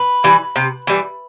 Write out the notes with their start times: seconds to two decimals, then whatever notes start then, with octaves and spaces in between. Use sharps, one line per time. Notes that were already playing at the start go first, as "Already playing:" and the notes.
Already playing: B4
0.24 E3 G3
0.56 C3
0.87 E3 G3